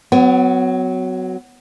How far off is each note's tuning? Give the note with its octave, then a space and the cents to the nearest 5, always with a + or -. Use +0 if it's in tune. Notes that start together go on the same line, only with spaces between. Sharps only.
F#3 +0 B3 +40